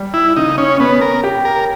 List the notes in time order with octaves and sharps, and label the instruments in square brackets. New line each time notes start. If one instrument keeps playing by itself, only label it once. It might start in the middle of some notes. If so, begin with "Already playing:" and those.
Already playing: [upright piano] G3
[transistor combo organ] E4
[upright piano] C#3 [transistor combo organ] D#4
[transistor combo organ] C#4
[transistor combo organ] B3 [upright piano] C#4
[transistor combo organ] A#4
[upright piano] G4
[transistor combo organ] A#4